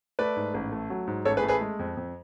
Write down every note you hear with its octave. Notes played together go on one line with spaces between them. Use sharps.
A3 B4 D5
G#2
A1
A3
F#3
G#2
A1 A4 C#5
G#4 B4
A3
G#4 B4
G#3
F2
F2